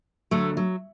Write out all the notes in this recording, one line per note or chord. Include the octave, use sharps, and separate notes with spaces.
D2 D3 F#3 A3
F#3